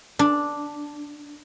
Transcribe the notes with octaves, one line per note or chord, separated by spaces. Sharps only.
D4